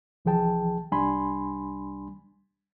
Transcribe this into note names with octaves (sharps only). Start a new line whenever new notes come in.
C2 E3 F3 G#4 G5 A5
C2 G3 D4 G#5 B5 C6